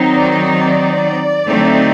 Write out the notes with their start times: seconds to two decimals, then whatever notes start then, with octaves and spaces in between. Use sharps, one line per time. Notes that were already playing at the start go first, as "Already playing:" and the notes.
Already playing: D#3 F#3 C4 D#4
0.13 D5
0.59 D5
1.47 D3 F#3 A3 C4 D#4